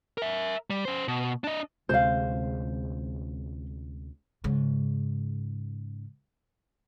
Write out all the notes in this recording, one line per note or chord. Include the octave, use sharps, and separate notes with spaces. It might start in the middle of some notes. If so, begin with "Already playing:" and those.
A#4 E5
G3
C#4 C5
B2
D4 D#5
D2 C3 G#3 C5 F5
G#2 C#3